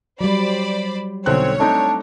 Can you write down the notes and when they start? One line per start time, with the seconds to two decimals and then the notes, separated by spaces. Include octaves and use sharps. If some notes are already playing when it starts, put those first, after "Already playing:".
0.21 F#3 G3 C5 D5 B5
1.26 B1 D3 C4 C#5 F#6
1.60 A3 C4 D4 D#4